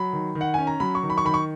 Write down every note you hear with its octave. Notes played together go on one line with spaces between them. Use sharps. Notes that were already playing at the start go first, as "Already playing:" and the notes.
Already playing: F#3 B5
D#3
D#3
F#5
C#4 G#5
A#5
F#3 B5
C#6
D#3
B5
C#6
D#3 B5
C#6